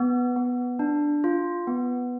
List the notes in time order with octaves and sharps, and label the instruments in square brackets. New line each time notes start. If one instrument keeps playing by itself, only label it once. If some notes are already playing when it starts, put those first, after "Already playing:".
Already playing: [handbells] B3
B3
D4
F4
B3